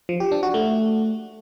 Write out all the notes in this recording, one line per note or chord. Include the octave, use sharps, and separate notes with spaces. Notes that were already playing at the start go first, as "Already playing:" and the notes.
F3
G4
D4
F#4
A3